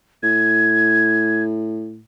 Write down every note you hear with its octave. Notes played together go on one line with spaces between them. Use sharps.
A2 G#6